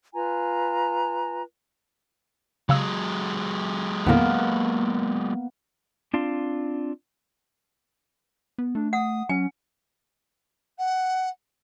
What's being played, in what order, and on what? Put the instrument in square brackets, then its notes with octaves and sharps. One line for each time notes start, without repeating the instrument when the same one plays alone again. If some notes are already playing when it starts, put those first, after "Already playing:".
[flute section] F4 B4 G#5 A#5
[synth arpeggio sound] C#3 F5 E6 [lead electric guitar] F#3 G#3
[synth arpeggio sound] D#2 A2 D3 [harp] A#3 B3
[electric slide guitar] C4 D4 F4
[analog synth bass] B3
[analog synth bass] A3 [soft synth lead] D4
[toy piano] F#5 [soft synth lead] D#6
[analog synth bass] F#3 [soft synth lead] C#4 [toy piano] G#5
[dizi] F#5